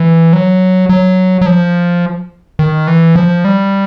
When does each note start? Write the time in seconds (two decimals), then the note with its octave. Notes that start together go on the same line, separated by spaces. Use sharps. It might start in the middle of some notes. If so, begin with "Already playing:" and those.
Already playing: E3
0.33 F#3
0.89 F#3
1.41 F#3
1.46 F3
2.59 D#3
2.87 E3
3.16 F3
3.45 G3